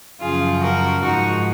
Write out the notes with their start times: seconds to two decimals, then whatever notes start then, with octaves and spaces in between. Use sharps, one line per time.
0.21 F#2 C#3 F3 F4 G#4
0.61 F#4 A#4
1.02 G#2 F3 D#4 F#4